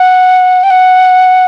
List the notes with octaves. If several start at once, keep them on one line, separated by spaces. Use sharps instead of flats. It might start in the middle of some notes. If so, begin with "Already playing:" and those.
Already playing: F#5
G5
F#5